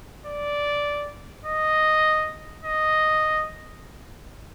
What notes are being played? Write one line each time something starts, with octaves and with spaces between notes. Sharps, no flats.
D5
D#5
D#5